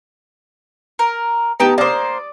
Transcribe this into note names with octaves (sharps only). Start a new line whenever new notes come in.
A#4
B3 D#4 G4 G5 A5
A#3 C5 D5 D6 D#6